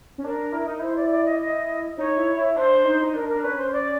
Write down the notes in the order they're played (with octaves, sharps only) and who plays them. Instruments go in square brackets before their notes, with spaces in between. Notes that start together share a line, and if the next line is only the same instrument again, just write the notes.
[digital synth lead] C#4
[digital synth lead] D4 [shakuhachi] A#4
[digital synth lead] E4
D#4
[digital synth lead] E4 [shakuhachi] C5
[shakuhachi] D5
D5
D#5
D#5
[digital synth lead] D#4 [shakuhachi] C#5
[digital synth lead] E4
E4
[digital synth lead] D4 [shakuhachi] C5
[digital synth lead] D#4
D#4
[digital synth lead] D4 [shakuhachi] A#4
[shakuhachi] A#4
[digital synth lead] D4
[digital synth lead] C#4 [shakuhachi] B4
[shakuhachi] C5
D5